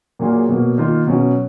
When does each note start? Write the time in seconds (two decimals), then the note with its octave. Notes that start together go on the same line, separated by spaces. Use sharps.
0.19 A#2 F#3 A#3 F4 G#4
0.49 B2 F#3 A#3
0.78 D#3 A#3 F4
1.06 B2 F#3 C#4